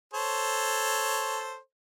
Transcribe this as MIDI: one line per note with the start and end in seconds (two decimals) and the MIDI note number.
0.14 1.57 69
0.14 1.57 72
0.14 1.57 73